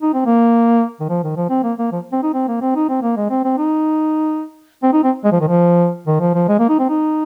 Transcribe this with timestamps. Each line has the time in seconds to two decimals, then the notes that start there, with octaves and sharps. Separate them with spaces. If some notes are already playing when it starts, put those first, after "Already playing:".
0.02 D#4
0.14 C4
0.26 A#3
1.00 D#3
1.09 F3
1.23 D#3
1.37 F3
1.50 C4
1.64 A#3
1.79 A#3
1.92 F3
2.12 C4
2.23 D#4
2.34 C4
2.48 A#3
2.62 C4
2.75 D#4
2.89 C4
3.02 A#3
3.17 G#3
3.30 C4
3.44 C4
3.58 D#4
4.83 C4
4.93 D#4
5.04 C4
5.24 G#3
5.32 F3
5.40 D#3
5.48 F3
6.07 D#3
6.20 F3
6.34 F3
6.48 G#3
6.59 A#3
6.69 D#4
6.79 C4
6.89 D#4